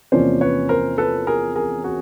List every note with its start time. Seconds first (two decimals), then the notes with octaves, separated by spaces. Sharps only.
0.12 E2 C3 F3 A#3 C#4 C5 D5
0.41 B4 C#5
0.69 A#4 C5
0.98 A4 B4
1.27 G#4 A#4
1.56 G#4 A#4
1.84 F#4 G#4